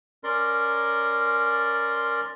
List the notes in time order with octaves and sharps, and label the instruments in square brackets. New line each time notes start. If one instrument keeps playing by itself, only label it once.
[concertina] C#4 A#4 D5 C6